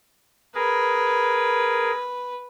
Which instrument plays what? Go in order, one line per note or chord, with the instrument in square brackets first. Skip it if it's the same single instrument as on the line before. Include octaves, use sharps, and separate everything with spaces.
[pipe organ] G#4 A#4 [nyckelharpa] B4